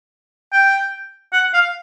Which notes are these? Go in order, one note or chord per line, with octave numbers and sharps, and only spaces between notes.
G5
F#5
F5